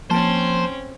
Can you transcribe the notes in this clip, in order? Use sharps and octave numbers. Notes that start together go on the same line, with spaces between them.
F3 A#3 C4 C#4 C5 A5